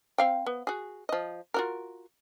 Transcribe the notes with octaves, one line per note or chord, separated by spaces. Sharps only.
C4 F5 G5
B3
F#4 G#4
F3 D#5
F4 F#4 A#4